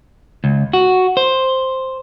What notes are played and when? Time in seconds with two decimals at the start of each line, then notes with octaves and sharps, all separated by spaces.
0.44 C#2
0.73 F#4
1.17 C5